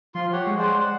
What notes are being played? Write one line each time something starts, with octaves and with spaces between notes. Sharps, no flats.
F3 F4 C6
G4 C#5 F#5
G#3
C5 D5 F#5
F#5